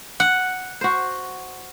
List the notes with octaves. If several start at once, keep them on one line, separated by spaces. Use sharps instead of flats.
F#5
F#4 C5